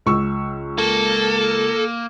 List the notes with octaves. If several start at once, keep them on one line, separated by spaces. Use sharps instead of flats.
C#2 C#6 E6
A#3 A4